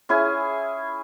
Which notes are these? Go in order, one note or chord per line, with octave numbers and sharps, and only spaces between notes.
C#4 E4 G#4 G#5